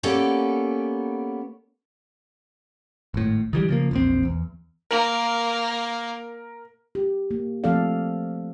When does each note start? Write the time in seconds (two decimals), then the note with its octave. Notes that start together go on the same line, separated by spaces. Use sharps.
0.03 A#3 B3 C#4 G4 A4 D5
3.14 G#1 A2
3.53 D#3 E3 G3
3.69 C#3 F3 A#3
3.91 E1 A#1 C4
4.25 E2
4.91 A#3 A#4
6.95 G4
7.31 A#3
7.64 F3 A3 C4 A4 D5 F5